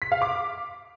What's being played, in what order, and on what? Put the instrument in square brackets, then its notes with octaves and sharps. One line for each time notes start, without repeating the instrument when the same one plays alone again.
[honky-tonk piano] B6
F5
D6